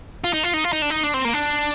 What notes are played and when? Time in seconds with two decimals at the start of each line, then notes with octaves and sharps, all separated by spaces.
0.24 F4
0.33 D#4
0.44 F4
0.54 D#4
0.64 F4
0.73 D#4
0.82 D4
0.90 D#4
1.03 D4
1.14 C4
1.25 A#3
1.34 D4